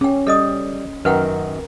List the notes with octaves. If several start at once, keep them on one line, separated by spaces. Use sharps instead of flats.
C#4 G#4 G5
G3 A4 D#5 D#6
F#2 D#3 A#4 B4 F#5 G5